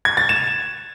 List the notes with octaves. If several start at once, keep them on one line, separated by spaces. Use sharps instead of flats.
G#6
A6
E7